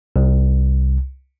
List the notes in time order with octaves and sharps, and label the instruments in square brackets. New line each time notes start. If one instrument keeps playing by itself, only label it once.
[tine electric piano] C2